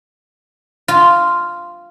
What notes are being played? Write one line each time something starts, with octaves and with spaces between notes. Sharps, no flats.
F4